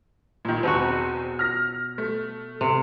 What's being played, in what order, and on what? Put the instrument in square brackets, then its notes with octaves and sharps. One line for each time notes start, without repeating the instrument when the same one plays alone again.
[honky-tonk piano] A#2 D#3
[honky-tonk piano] E2 C4 [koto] B2 F#4
[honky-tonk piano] F6 A#6
A3
[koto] C3